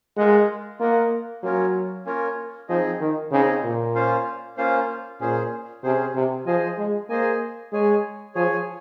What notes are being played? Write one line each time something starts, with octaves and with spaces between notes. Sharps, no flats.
G#3 F4 A#4 D#5 F#5
A#3 F4 A#4 D#5 F#5
F#3 A#3 C#4 F4 A#4 C#5
A#3 C#4 F4 A#4 C#5
F3 C4 D#4 G#4 D#5
D#3
C#3 C4 D#4 G#4 D#5
A#2
A#3 C#4 F4 C5 F5
A#3 C#4 F4 C5 F5
A#2 C#4 G#4 C5
C3 C#4 G#4 C5
C3
F3 G#4 C5 D#5 G#5
G#3
A#3 G#4 C5 D#5 G#5
G#3 G#4 C#5 G#5
F3 G#4 C#5 G#5